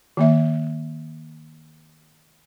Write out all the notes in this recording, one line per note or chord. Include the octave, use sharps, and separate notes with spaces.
D#3 A#3 E5